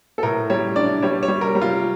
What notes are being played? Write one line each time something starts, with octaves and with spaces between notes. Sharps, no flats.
A4
A2 A#4
G3 C#5
D4 D5
G3 C#5
C#5
G3
A#4
G3
F4